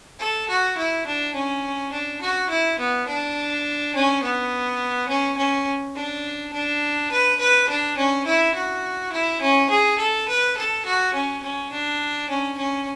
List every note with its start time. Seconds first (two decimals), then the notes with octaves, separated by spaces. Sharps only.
0.19 A4
0.49 F#4
0.77 E4
1.07 D4
1.34 C#4
1.92 D4
2.21 F#4
2.50 E4
2.79 B3
3.08 D4
3.95 C#4
4.23 B3
5.09 C#4
5.38 C#4
5.96 D4
6.53 D4
7.12 B4
7.40 B4
7.69 D4
7.97 C#4
8.26 E4
8.54 F#4
9.12 E4
9.41 C#4
9.70 G#4
9.99 A4
10.28 B4
10.57 A4
10.86 F#4
11.14 C#4
11.43 C#4
11.72 D4
12.30 C#4
12.58 C#4